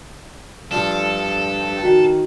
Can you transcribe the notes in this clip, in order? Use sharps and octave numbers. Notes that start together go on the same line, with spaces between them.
G2 F3 D4 A4
D#3 F#4